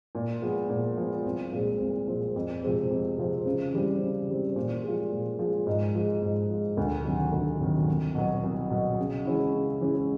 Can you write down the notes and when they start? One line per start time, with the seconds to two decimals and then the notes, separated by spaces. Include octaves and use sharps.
0.15 A#2
0.42 F3 G#3 B3
0.69 A#2
0.97 F3 G#3 B3
1.25 C2
1.52 A#2 F3 G#3 C4
1.80 C2
2.07 A#2 F3 G#3 C4
2.36 F2
2.63 C3 F3 G#3 C4
2.91 F2
3.18 C3 F3 G#3 C4
3.46 C#3
3.73 E3 G3 C4
4.01 C#3
4.28 E3 G3 C4
4.56 A#2
4.84 F3 G#3
5.11 A#2
5.39 F3 G#3
5.67 G#2
5.95 F3 G#3
6.22 G#2
6.50 F3 G#3
6.77 D2
7.05 C3 D#3 F#3
7.32 D2
7.60 C3 D#3 F#3
7.88 C2
8.15 B2 F#3
8.43 C2
8.70 B2 F#3
8.99 C#3
9.25 E3 G#3 C#4 E4
9.54 C#3
9.81 E3 G#3 C#4 E4